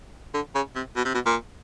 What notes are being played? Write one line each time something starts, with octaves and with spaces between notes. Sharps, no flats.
D3
C#3
C3
B2
C3
B2
A#2